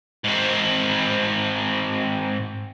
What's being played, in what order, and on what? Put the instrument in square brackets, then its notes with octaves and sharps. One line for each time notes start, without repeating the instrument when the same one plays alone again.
[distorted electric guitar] G#2 C4